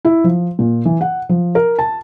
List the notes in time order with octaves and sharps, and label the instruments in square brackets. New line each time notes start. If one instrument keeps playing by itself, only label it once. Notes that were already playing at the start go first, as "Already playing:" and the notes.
[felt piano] E4
F3
A#2
E3
F#5
F3
A#4
A5